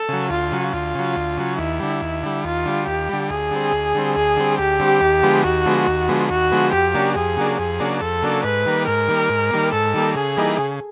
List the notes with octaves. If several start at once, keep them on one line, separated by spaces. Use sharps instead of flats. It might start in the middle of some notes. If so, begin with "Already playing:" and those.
Already playing: A4
C#3 F#3
D2 F4
C#3 F#3
D2 F4
C#3 F#3
D2
C#3 F#3
D#2 E4
D3 G3
D#2
D3 G3
D#2 F4
D3 G3
D#2 G4
D3 G3
D2 G#4
D3 G3 C4
D2
D3 G3 C4
D2 G#4
D3 G3 C4
D2 G4
D3 G3 C4
D#2
D3 F3 G#3 B3
D#2 F#4
D3 F3 G#3 B3
D#2
D3 F3 G#3 B3
D#2 F#4
D3 F3 G#3 B3
F2 G4
C#3 F#3 A#3 D4
F2 G#4
C#3 F#3 A#3 D4
F2 G#4
C#3 F#3 A#3 D4
F2 A4
C#3 F#3 A#3 D4
G#2 B4
D#3 G3 A#3
G#2 A#4
D#3 G3 A#3
G#2
D#3 G3 A#3
G#2 A4
D#3 G3 A#3
C#3 G#4
E3 G3 A#3 D#4
C#3